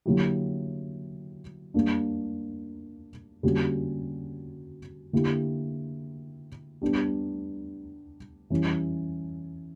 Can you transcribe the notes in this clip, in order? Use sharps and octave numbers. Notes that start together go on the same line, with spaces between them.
D3 F#3 A#3 E4 G4
G3 A#3 D4
D3 G3 A#3 C#4 F#4
D3 A#3 E4 G4
G3 B3 D4 G4
E3 G3 C#4